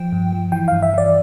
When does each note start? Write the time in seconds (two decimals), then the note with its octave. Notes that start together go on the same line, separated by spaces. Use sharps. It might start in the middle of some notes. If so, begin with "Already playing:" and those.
Already playing: F3 G5
0.12 G2
0.33 F3
0.52 E3 G5
0.68 G2 F5
0.83 E5
0.94 E3 D5